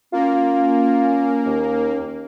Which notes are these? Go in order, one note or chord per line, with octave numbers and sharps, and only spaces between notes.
A#3 C#4 F4
D#2